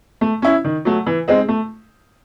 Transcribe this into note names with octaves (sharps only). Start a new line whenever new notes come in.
A3
C#4 E4
D#3
F#3 A3
E3
G#3 C4 D#4
A3